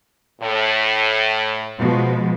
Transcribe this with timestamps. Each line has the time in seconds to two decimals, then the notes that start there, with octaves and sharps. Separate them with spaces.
0.42 A2
1.78 B2 F3 G#3